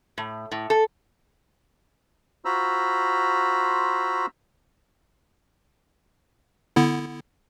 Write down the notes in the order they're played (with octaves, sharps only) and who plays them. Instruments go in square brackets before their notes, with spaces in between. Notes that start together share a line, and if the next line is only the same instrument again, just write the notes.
[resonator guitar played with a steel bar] A2
A2
A4
[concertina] F4 F#4 C5 A#5 B5 E6
[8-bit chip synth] D3 B3 E4